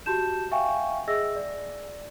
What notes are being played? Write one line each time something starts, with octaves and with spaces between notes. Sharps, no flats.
F#4 G4 A5 G6 E7
E5 F5 G5 G#5 C#6
G#4 D#5 E5 E6 A#6
D5